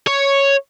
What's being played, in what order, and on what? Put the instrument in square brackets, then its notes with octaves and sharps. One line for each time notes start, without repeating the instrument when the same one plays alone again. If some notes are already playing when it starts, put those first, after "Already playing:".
[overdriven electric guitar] C#5